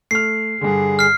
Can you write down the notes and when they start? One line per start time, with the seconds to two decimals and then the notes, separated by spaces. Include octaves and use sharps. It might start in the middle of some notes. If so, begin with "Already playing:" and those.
0.11 A3 F6 C7
0.61 G2 D3 G#4
0.99 F6 C7